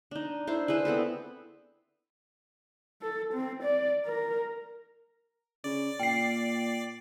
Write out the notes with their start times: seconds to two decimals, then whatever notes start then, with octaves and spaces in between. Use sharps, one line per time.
0.11 D4 D#4
0.47 D4 E4 C5
0.68 E4 G#4 B4 C5
0.85 B3 C4 A4 B4
3.02 A4
3.33 C4
3.63 D5
4.06 A#4
5.64 C#3 D5
6.00 A#2 G5 C7